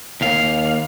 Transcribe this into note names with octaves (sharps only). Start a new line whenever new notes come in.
D#2 F5